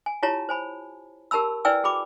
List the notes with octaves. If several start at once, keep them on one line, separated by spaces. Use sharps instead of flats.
G#5
E4 F4 G4 C#5 A5 A#5
C5 G#5 B5
G4 A#4 A5 B5 E6
E4 B4 D5 G5 G#5 E6
F#4 G#4 G5 B5 D6